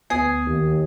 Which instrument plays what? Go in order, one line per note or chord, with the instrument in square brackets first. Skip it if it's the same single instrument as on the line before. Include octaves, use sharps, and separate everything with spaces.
[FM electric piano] D2 B3 [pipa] G#4
[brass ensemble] D#2